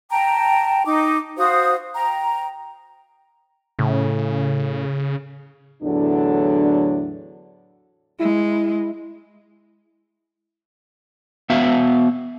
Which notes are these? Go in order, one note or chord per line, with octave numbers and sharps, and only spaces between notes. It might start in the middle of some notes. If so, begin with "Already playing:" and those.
G5 A5 A#5
D#4 D6
F#4 C5 F5 D#6
G5 A#5
A2 C#3
E2 A2 D3 F#3 D4
G#3 E4
B3 F#4 E5 F5